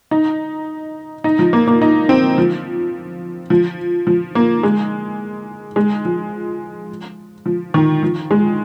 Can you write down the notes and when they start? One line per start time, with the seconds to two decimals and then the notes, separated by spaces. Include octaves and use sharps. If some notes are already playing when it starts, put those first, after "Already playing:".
0.11 D#4
1.24 D#4
1.39 F3
1.53 A#3
1.68 A#3
1.82 D#4
2.09 C4
2.38 F3
3.50 F3
4.07 F3
4.35 A#3
4.63 G#3
5.76 G#3
6.05 F3
7.46 F3
7.74 D#3
8.03 F3
8.31 G#3